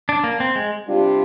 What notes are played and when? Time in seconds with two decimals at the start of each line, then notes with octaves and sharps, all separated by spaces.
0.09 D4
0.24 A#3
0.40 C4
0.56 G#3
0.87 C3 G3 D4 F4